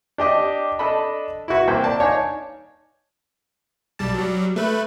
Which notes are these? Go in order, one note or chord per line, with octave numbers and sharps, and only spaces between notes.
D4 G4 D#5
D4 A4 D#5 A5 B5
E4 F#4 B4
C2 A#3 C5 G5
D5 A5
D4 D#4 C#5 F5 G#5 A5
B1 G3 A5
F#3 G3
A3 B4